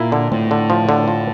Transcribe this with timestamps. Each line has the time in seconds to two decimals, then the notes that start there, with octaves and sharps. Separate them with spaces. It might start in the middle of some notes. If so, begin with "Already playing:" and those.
Already playing: A#2 E4
0.12 D3
0.32 A2 C4
0.51 D3
0.70 F3
0.89 D3
1.08 F3